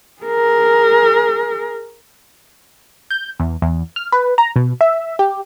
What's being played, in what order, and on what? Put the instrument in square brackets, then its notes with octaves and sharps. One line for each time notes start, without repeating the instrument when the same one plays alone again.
[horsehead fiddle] G#4 A#4
[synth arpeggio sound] G6
E2
E2
F6
B4
A#5
B2
E5
G4